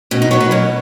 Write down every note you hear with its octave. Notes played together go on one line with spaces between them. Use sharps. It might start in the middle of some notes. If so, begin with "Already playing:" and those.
B2 C#4
D#4
F#3 B3 C#5
B4
B2 C#4